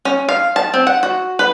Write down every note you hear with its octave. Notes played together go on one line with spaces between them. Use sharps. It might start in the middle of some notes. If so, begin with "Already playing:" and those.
C#4
F5
A5
C4
F#5
F#4
B4